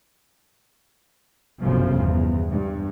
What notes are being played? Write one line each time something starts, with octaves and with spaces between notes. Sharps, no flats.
G1 C2 F#2 C#3 F3
E2
G2